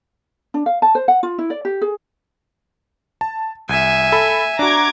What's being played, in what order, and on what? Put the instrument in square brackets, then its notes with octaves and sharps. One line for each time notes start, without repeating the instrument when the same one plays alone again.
[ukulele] D4
F5
A5
C5
F#5
F4
E4
D5
G4
G#4
[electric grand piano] A5
[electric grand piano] C2 [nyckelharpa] E5 G#5
[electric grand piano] A4 B5
[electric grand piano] D4 F#4 [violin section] A#5 D6 G#6